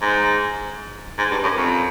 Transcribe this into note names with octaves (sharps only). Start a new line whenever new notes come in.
G#2
G#2
G2
F#2
F2